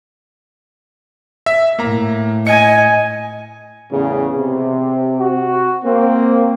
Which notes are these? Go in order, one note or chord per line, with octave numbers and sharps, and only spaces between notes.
E5 B6
A2 A#3 A#5
D#5 G#5 C#7
E2 A2 C#3
C3
F#4
A#3 C4